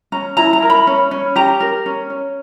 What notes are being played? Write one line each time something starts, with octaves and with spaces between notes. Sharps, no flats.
C#4 A#5
E4 A#5
A#5
A#4
B5
C#4
C#4
G4 A#5
A#4
C#4
C#4